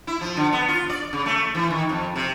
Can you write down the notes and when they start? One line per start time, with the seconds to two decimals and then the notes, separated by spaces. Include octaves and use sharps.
0.07 E4
0.21 F3
0.37 D3
0.53 B3
0.69 F4
0.90 D5
1.13 C#3
1.26 A3
1.55 E3
1.70 D#3
1.89 F2
2.16 C3